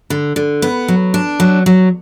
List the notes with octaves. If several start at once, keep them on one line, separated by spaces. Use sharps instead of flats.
D3
D3
B3
F#3
D4
F#3
F#3